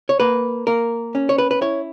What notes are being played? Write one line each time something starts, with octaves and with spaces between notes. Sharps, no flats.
C#5
A#3 B4
A#3 A#4
C#4
C#5
B4
B4
E4 C#5